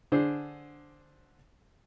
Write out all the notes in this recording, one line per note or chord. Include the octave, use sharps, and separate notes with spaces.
D3 D4 G#4 C5